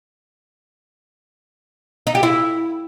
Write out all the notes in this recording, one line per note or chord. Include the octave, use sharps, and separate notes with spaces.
D#4
G4
E4